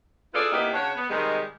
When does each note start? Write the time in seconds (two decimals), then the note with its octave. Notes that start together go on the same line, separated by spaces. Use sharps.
0.34 E4 F4 G#4 A4 B4 D5
0.52 C3 A#3 B3 D#4 E4 G4
0.73 C#3 D4 F#4 C#5
0.95 B3
1.10 C3 D#3 G3 G#3